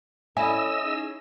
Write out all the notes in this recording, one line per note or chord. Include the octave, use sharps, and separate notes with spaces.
C#4 E4 A4 C#5 D#5 G#5 E6
C#4 D#4 G#4